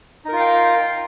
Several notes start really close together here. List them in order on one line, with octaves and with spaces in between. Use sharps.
D#4 A#4 F4 F5 G5